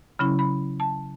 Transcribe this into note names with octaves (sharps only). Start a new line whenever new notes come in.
C#3 F#3 C#4 E4 B5
B5
A5